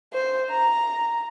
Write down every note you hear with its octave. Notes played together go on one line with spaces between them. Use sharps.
C5
A#5